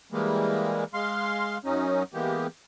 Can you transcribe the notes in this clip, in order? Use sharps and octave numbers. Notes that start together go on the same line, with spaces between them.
E3 G3 G#3 A#3
G#3 F5 C6
F#2 F#3 C#4 D#4
E3 G#3 A#3 B3 G4